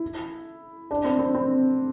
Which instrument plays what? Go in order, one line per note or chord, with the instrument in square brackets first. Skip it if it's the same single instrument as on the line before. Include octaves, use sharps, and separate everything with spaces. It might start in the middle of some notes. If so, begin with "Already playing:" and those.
Already playing: [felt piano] E4
D4
C4
C4
C4